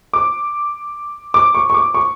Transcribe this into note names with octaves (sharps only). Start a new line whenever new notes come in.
D6
D6
C#6
C#6
D6
C#6